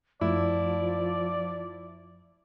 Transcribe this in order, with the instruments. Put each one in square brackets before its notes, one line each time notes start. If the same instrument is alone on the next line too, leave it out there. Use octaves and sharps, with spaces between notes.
[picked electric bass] F#2 A3 [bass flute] F3 [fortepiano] E4 [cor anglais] D5